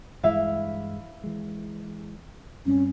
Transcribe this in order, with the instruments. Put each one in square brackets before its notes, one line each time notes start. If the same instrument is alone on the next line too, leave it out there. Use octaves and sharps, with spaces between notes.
[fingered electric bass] G2 E3 G#3 [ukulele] E4 E5 F5
[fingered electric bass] E3 G#3
[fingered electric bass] G2 G3 C4 [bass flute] C#4